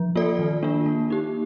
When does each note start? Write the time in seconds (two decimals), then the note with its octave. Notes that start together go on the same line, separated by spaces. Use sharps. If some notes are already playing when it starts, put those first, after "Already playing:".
Already playing: F3
0.16 A#3 F4 A4 D5
0.39 D#3
0.63 A#3 D4 F4
0.86 A#3
1.10 D#4 G4